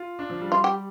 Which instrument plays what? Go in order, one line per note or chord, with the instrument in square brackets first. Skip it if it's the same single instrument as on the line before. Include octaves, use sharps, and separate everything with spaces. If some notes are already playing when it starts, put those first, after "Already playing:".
Already playing: [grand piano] F4
D4
F3
G3
[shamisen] F4
G4